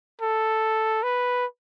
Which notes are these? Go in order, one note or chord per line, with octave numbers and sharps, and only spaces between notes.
A4
B4